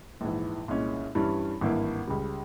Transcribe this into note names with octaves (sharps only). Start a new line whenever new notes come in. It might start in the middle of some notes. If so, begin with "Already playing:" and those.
A#1 G#2 E3
C2 A#2 G#3 C#4
G2 E3 G3 C#4 E4
G#1 G2 E3 A#3 E4
C#2 C#3 G3